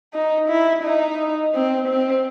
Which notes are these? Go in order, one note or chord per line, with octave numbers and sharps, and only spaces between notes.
D#4
E4
D#4
C4
C4